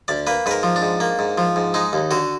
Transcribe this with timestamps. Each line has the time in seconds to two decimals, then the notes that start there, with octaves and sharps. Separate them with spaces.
0.08 D2 D5
0.27 A#3 B4
0.46 G#2 B4
0.51 A#4
0.63 F3
0.76 D4
0.82 G#2
1.00 A#3
1.19 G#2
1.38 F3
1.56 G#2
1.74 G#3 D#4
1.93 D#2
2.11 D3 F#4